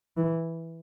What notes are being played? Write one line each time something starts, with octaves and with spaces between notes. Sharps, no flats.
E3